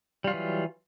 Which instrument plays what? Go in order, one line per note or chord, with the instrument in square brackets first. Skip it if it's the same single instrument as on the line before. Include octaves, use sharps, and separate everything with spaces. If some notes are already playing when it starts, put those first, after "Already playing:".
[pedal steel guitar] G3
F4
F#3
E3